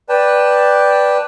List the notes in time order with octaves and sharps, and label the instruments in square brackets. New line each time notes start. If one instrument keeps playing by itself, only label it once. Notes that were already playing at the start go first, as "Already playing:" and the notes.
[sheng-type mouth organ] B4 D5 G5 A5